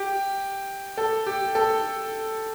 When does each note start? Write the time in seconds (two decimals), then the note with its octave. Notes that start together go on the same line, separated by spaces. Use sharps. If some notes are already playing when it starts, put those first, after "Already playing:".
Already playing: G4
0.97 A4
1.26 G4
1.55 A4